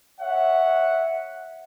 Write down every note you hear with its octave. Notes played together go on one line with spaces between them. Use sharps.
C#5 E5 F#5